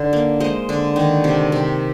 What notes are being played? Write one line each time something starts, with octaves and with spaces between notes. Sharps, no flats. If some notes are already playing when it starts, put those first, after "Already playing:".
Already playing: D3 D#4
A#3
G#3 C5 D#5
D3
D#3
C3
C3